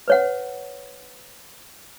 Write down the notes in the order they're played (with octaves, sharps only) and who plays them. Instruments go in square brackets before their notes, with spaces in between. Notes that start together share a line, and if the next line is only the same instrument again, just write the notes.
[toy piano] B4 C#5 F#5